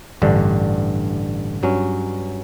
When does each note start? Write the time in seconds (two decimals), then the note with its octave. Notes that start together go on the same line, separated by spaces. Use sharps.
0.22 A1 G2 D3
1.63 G2 F#3 C#4